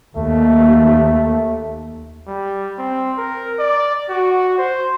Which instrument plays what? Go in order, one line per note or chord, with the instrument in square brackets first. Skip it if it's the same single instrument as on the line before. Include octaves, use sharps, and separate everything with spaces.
[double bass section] D#2 [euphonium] A3
[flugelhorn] G3
C4
A#4
D5
F#4
C5